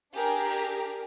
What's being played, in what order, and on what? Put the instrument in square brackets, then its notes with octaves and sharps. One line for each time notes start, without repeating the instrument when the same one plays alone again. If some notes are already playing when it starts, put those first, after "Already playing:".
[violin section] D4 G4 G#4 A#4